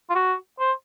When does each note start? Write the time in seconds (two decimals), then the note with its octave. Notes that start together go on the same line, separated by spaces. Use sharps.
0.10 F4
0.15 F#4
0.59 C5